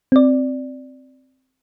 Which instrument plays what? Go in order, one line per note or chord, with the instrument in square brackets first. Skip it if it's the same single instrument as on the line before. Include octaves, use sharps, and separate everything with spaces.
[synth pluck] C4 D5